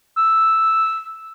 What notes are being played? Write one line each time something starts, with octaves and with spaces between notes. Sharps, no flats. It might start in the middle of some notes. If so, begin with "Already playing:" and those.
E6